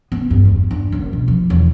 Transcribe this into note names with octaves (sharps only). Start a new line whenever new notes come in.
B3
G2
E2
D4
F#1
B2
F3
E2